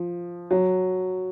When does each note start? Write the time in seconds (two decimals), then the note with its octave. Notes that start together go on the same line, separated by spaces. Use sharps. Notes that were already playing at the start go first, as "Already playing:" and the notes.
Already playing: F3
0.51 F#3